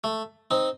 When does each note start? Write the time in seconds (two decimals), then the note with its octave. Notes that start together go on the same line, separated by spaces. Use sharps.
0.04 A3
0.51 C4 D#4